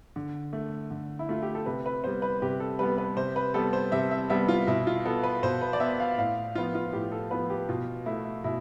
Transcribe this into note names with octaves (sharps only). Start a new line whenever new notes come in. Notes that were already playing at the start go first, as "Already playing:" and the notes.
D3
A3
D3
E4
A3 F4
G4
A4
C3 B4
B4
G3 B3 C5
B4
C3 G4
A4
G3 B3 B4
B4
C3 C5
B4
G3 B3 A4
C5
C3 E5
E5
G3 B3 E5
F4
B2 E4
F4
B3 A4
B4
B2 C5
B4
D5
B3 E5
F5
A2 F5
F3 B3 F4
F4
A2 G4
A4
F3 B3 B4
G4
B2 F4
A3 E4
B2 E4